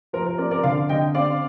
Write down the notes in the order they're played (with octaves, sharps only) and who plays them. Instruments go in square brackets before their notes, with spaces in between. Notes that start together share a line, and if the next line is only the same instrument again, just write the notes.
[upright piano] F3 A#4
A#4
C4 A#4 D5
A#4 D5
D3 D5 F5
D3 D#5 G5
C4 D5 F5